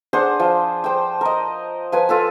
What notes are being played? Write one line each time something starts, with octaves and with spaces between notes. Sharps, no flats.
D4 G#4 C5 F#5
F3
C5 G5
A#4 D#5
F3 B4 G#5
F4 A4 B4